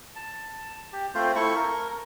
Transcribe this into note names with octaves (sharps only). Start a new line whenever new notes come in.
A5
G4
A3 C4 F4 C5
A3 E4 A4 C#6
A#4